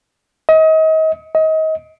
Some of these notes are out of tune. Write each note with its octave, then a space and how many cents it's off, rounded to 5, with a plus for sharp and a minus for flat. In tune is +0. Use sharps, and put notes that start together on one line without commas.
D#5 +35
D#5 +30